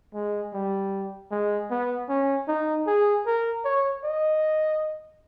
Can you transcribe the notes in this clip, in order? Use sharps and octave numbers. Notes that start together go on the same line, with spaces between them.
G#3
G3
G#3
B3
C#4
D#4
G#4
A#4
C#5
D#5